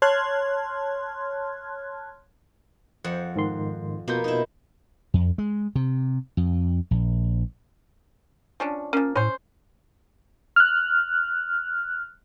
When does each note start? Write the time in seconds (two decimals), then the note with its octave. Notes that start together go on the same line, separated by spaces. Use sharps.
0.02 C#5 A5 C6 F6 F#6 G#6
3.04 F2 C5 F#5
3.36 G#2 D#3 C6
4.08 B2 A#3 B3 F4 G6
4.24 D#4 E4
5.14 F2
5.38 G#3
5.75 C3
6.37 F2
6.91 A#1
8.60 F3 C#4 D4
8.93 F3 A#3 C#4
9.16 A2 C#4 C5
10.56 F6 F#6